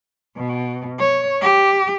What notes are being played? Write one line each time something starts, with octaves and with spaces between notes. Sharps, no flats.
B2
C#5
G4